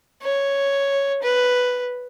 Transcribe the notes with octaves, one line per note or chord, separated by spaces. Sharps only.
C#5
B4